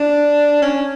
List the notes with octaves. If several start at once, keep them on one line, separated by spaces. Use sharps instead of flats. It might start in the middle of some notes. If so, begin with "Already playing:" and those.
Already playing: D4
C#4